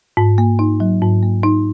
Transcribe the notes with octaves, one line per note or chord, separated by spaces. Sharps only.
G#2
A#3
D#4
F#3
G#2
A#3
D#4